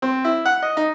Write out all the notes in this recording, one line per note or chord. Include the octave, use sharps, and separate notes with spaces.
C4
E4
F#5
D#5
D#4